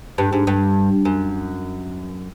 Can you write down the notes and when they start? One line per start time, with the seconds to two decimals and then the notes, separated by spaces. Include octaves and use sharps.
0.18 G2
0.33 G#2
0.47 G2
1.05 F#2